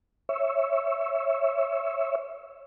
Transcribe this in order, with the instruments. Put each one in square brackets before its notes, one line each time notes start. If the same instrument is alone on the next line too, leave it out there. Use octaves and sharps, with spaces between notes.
[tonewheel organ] C#5 E5